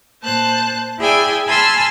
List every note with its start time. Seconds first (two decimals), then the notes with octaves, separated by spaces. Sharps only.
0.23 A#2 C5 A5 F#6
0.99 E4 G#4 D5 E5 G5 G#5
1.47 G#5 A5 B5 C6 E6 F6